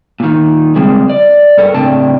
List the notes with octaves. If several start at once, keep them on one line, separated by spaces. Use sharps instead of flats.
A#2 D#3
C#3 G3 G#3 A#3 C4
D5
G2 A4 A#4
A2 C#3 C4 D4 G5 A5